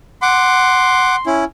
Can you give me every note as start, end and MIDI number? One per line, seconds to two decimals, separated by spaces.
0.22 1.16 78
0.22 1.35 84
0.22 1.16 86
1.26 1.44 61
1.26 1.44 64